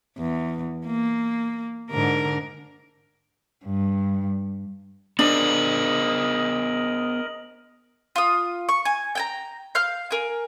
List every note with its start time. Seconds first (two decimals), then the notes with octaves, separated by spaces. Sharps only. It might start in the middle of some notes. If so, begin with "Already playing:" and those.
0.17 E2
0.86 A#3
1.91 G#2 D3 A#4
3.66 G2
5.19 B3 D4 G#4 A#4 C5 D#5 F#7
8.16 F4 D#6
8.69 C#6
8.85 G#5
9.15 G5 G#5 A#5
9.75 F5 F6 G6
10.11 A#4 G#5